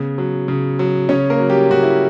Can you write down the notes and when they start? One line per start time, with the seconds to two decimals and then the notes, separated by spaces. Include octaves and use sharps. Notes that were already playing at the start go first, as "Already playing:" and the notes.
Already playing: C#3 B3
0.18 F#3
0.48 C#3
0.79 F#3
1.09 C#3 C#4 C#5
1.30 A#3 A#4
1.40 F#3
1.50 G3 G4
1.71 C#3 F#4
1.83 E4